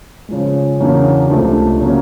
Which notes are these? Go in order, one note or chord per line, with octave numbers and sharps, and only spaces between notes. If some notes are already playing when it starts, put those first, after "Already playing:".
C#3 F3 G#3
E2 C#3 F#3 A#3 D4
C#2 C3 F3 A3 D4
C#3 F#3 A#3 C#4